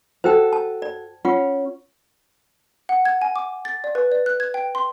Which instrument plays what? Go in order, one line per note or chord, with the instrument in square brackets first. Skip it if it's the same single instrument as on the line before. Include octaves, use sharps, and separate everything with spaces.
[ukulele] F#4 A4 [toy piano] C5 G5
[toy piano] A5
D5
[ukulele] C#4 [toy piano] F4 F#5
[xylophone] F#5
G#6
G#5
D6
A6
D5
B4
D5
F#6
G#6
G5
C6